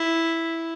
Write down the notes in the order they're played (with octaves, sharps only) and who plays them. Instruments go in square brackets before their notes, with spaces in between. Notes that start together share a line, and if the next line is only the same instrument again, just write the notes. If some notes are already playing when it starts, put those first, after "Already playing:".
Already playing: [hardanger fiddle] E4